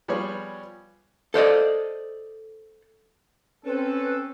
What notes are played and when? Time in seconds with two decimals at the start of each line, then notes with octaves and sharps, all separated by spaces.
0.08 F3 G3 B3 F4 G#4 C#5
1.34 A4 C5 D5 D#5
3.65 C4 C#4 A4 B4